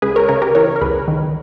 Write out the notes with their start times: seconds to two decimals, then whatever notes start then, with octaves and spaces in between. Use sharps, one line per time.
0.02 C#2 G#4 B4
0.16 A#4 C#5
0.28 C#3 A#4 C#5
0.42 G4 A#4
0.55 E3 A#4 C#5
0.76 A#4
0.81 C#2 G#4 B4
1.08 D#3